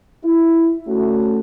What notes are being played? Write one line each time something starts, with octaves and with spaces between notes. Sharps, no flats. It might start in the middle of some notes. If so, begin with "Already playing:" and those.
E4
A3 C#4 F#4